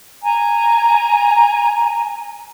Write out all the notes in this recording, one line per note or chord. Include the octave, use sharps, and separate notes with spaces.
G#5 A#5